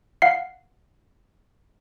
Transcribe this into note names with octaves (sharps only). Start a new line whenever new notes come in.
F5 F#5 C7